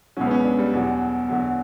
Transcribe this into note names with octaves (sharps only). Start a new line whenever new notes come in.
C#2 B2 F#3 C#4
B3
C#4
D4
G3
E2 B2 F#3
E2 D3 F#3